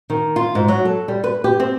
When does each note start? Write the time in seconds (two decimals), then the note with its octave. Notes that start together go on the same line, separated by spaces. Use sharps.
0.10 D#3
0.36 F4
0.55 G#2
0.68 F#3
0.85 A4
1.08 G3
1.24 B4
1.44 G4
1.60 C4